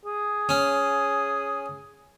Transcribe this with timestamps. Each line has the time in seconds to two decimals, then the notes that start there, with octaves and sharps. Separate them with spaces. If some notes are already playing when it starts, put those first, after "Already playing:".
0.05 G#4
0.49 C#4